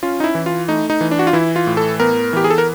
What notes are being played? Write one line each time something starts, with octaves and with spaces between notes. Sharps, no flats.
C#4 F4
D#4
E4
E3
F4
A3 D#4
D#4
E3
D4
F#4
F4
E3 E4
F4
A2
A4
B3 A#4
E3 G4
G#4
A4
A#4